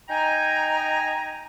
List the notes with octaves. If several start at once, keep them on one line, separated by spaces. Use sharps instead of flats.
D#4 G5 G#5 A#5